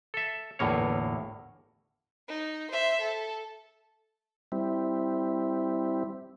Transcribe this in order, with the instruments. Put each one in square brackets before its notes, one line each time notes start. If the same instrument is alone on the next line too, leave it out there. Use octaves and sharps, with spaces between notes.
[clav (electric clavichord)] A4 E5
G1 E2 A2 A#3 C#5
[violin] D#4
C5 E5
A4
[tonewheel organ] G3 C4 E4